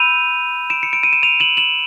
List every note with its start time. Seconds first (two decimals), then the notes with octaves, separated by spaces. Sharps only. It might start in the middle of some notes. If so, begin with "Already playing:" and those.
Already playing: B5 E6 G6 D#7 F7
0.70 D7 E7
0.83 C#7
0.93 D7
1.03 D#7
1.13 E7
1.23 D#7 F7
1.40 E7 F#7
1.57 E7 F#7